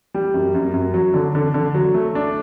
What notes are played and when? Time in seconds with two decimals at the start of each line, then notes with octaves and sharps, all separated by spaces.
0.14 G3
0.34 F#2
0.55 F#2
0.74 F#2
0.94 F#3
1.14 D3
1.35 D3
1.54 D3
1.74 F#3
1.94 A3
2.15 D4